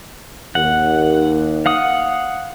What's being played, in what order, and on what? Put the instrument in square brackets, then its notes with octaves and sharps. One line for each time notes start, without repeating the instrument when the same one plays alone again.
[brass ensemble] D#2 [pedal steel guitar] F#5
[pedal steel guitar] F5 F#5 D#6